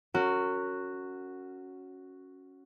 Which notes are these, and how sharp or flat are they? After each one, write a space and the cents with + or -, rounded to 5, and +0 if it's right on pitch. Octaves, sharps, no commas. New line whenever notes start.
C#4 +0 F#4 +0 A#4 -30